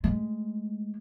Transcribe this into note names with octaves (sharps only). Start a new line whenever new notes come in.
G#3 A3